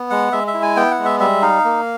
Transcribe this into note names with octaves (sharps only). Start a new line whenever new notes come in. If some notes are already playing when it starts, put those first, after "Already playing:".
Already playing: B3
G#3 F#5
G#3 E5
E5
E4
G#5
B3 G5
F#5
G#3
E5
G3 E5
D#4 F5
A#3